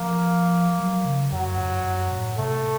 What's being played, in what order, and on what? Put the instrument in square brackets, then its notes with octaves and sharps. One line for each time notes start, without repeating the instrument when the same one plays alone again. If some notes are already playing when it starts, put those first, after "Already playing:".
Already playing: [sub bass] F3 [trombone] A#3
[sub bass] F#3
C#3
[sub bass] F2 [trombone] F#3
[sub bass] F#2
F2
F#2
F#2
A2
[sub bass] C3 [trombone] A3